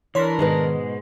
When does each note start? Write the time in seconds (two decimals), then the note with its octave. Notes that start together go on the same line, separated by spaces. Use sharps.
0.15 E3 D4 A#4 C#5 C6 B6
0.39 G#2 B2 D#3 G#3 B4